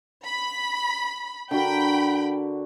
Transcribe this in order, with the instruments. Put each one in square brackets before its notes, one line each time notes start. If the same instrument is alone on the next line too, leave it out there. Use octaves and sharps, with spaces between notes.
[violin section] B5
[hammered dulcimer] D3 F#4 A#4 [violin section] G5 B5